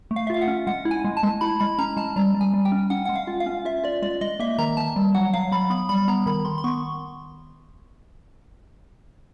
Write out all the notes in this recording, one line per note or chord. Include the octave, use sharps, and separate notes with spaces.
A3
F5
E5
F4 F5
F#5
C#4
G#3 F#5
E4
G#5
G#3
A5
G#3
E4 B5
G#3 B5
C#4 A#5
G#3 A5
G3 A#5
G3
G#5
G3
G5
C#4
C#4 F#5
G#3 F#5
F5
F4
F5
C#4
F4 E5
F4 D5
G#3 D5
G#3 D#5
A#3 E5
D#3 A#5
D#3 A5
G3
F#3 F#5
F#3 F5
F#3 B5
B3 B5
G3 B5
B3 A#5
D#3 B5
D#3 C6
C6
B3 C#6